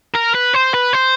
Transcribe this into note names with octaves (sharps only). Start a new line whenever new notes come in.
A#4
B4
C5
B4
C5